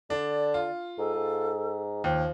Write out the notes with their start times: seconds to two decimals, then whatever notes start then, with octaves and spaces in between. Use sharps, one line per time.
0.10 D3 D4 D5
0.54 F4
0.98 G#2 A4
1.15 G#2
2.04 D#2 F3 G5